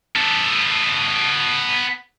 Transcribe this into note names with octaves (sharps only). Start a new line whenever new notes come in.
B3 A4